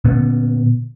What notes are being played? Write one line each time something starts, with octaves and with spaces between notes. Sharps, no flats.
A#2 D3 B3 C#4